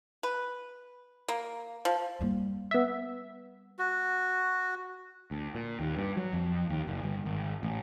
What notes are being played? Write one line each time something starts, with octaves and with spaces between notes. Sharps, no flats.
B4
A#3
F3
G3 A#3
B3 E5
F#4
D2
A#2
D#2
G2
F#3
F2
D#2
F#1
G1
G#1
A1